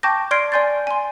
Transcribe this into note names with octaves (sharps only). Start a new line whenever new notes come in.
G5 A5 C#6 D6 G6 A#6
D5 C6 F6 G#6 C7 D7
D5 G#5 C6 G6 A6
G#5 C6